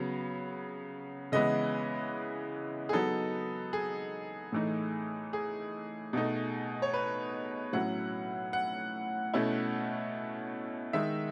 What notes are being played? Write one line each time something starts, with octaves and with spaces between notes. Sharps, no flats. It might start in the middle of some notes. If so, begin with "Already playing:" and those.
Already playing: C#3 F#3 B3
C#3 E3 G#3 B3 E4 D#5
G#4
F#3 B3 D#4 A4
G#4
A2 E3 A3 D#4
G#4
B2 A3 D#4
C#5
B4
A2 F#3 C#4 E4 F#5
F#5
B2 A3 C#4 E4
D#3 G#3 D#4 E5